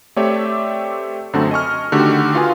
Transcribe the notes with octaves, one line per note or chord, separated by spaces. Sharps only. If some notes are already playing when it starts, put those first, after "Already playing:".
A3 C4 G4 C#5 D5 E5
F#2 D3 A3 C4 F#4 A5
D#5 G#5 C#6 F6
D3 D#3 A3 F#4 G4
F4 F#4 B4 F5 G#5 D#6